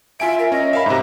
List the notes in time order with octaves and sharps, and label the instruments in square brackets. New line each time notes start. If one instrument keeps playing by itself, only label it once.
[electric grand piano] F4 G#5 D7 [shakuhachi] E5
[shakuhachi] A#4
[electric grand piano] C#4 [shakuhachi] D#5
[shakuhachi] A#4 [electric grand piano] E5 F5 B5
[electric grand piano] G#2 C3 [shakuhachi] A#5